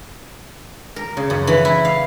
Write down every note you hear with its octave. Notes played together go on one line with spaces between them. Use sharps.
A#4
C#3
F#2
E3
E4
F5